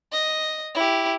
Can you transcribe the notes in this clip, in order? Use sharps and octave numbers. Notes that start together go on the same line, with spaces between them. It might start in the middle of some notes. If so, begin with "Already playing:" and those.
D#5
E4 G4